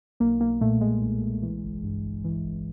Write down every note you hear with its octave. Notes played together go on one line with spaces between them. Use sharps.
B1 A#3
B1 A#3
A#2 A3
A#2 G#3
B1
B1
E3
G1
G2
G1
E3
G1